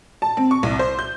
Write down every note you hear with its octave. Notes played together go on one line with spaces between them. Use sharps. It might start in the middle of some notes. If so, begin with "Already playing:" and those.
A5
C4
C#6
C2
C5
G6